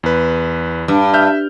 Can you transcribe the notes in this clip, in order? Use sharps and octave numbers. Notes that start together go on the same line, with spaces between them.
E2 B4
G2
E5 F6 G6